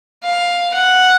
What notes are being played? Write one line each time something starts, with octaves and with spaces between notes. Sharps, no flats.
F5
F#5